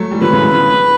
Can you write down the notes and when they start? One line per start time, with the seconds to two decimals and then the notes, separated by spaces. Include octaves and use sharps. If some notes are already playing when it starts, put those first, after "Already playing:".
Already playing: F#3 A3
0.12 E3 G3
0.22 D3 F#3 B4
0.33 C#3 E3
0.43 D3
0.54 C#3 E3